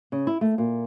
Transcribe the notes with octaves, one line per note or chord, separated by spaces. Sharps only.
C#3
E4
A3
A#2